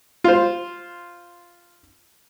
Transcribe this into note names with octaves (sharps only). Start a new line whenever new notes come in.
F4 C5